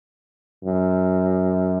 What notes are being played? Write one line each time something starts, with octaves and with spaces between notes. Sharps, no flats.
F#2